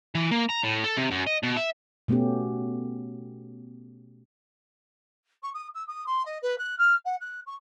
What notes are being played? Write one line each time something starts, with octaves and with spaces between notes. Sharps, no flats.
E3
A#3
A#5
A2
A4
C3
F#2
D#5
B2
E5
B2 A3 B3 C#4 G4
C#6
D#6
E6
D#6
C6
D#5
B4
F#6
F6
F#5
F#6
C#6